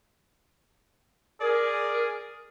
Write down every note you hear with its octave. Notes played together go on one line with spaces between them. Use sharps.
G#4 A#4 D5